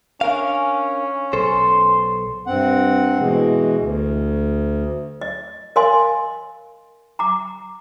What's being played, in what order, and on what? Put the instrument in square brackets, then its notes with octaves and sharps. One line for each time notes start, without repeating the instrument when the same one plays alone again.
[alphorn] C#4 [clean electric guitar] D4 A#4 F5
[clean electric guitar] B1 A4 C5 [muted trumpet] C6
[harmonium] G2 C4 F#5
B2 E3 G#3
D2
[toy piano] D#5
A#4 D#5 F5 G#5 C6
A#5 D6